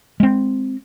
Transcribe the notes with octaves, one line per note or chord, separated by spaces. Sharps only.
G#3 C4